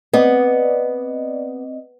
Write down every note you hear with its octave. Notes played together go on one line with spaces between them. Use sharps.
B3 C4 D5 D#5